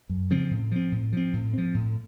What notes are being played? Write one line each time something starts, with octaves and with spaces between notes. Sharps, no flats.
F#2
C#3 F3 C4
A2
F3 C4
A2
F3 C4
A2
F3 C4
A2